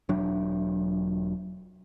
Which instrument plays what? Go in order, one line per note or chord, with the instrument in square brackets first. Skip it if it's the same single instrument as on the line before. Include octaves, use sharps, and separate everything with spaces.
[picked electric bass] E1 F#3 D4